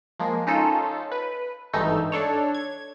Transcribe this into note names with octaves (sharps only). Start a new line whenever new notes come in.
F3 G#3 A#3
C#4 D#4 F4 A4
B4
G#1 G2 E3 A3 D#4 E6
D4 A4 C#5
G#6